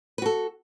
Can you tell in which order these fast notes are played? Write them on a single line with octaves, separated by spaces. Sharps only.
B4 F#4 A4